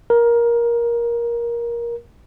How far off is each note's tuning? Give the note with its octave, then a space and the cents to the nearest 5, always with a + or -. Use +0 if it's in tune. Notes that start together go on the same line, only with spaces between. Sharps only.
A#4 +15